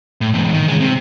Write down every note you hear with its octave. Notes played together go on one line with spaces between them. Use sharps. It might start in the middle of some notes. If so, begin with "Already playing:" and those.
A2
E2 G#2
D#3
C#3 G#3
C3